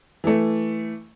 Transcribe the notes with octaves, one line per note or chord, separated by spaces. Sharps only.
E3 A3